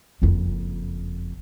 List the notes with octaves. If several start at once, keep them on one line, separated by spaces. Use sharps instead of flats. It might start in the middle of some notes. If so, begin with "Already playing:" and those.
F#1 F2